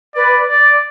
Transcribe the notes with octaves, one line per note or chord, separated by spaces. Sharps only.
B4 D5
D5